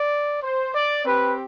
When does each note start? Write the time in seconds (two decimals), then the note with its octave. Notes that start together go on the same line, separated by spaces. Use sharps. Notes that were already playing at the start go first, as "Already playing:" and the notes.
Already playing: D5
0.43 C5
0.75 D5
1.05 C4 G4 B4